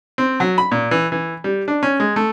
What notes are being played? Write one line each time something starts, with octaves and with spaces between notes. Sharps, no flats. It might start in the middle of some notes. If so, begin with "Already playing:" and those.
C4
F#3
B5
A#2
E3
E3
G3
D4
C#4
G#3
A3